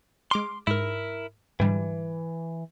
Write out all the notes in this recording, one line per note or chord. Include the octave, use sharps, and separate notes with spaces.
G#3 C6 D6 F6
G#2 E4 A#4
G#2 D3 E3 G3